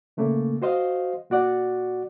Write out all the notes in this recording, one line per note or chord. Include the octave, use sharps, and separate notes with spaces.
A#2 C#3 A3 A#3
F#4 C5 D#5 F5
A#2 F#4 D5 F#5